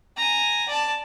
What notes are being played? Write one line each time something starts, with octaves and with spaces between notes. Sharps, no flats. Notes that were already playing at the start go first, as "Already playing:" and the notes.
G#5 A#5
D5 A5